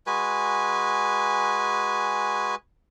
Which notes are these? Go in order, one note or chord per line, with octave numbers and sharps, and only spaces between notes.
G#3 F#4 B4 G#5